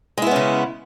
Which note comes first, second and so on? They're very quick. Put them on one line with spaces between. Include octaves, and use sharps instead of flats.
G#3 E4 B3 C#4 C#3